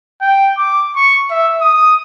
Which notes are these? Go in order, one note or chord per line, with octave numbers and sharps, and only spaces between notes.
G5
D6
C#6
E5
D#6